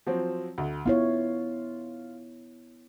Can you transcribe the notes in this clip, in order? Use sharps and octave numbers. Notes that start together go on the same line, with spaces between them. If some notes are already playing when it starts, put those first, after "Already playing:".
F3 F#3 C4
D2
B3 E4 F4 C#5